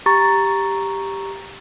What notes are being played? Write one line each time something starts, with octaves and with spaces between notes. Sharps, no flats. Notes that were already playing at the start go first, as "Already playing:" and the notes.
G4 A#5 C#6 A6